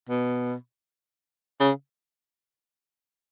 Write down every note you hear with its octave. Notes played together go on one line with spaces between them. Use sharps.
B2
C#3